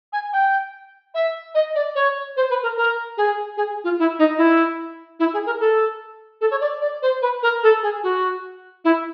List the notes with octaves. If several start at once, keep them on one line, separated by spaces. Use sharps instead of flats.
G#5
G5
E5
D#5
D5
C#5
C5
B4
A#4
A#4
G#4
G#4
F4
E4
D#4
E4
E4
G#4
A#4
A4
A4
C#5
D5
D5
C5
B4
A#4
A4
G#4
F#4
E4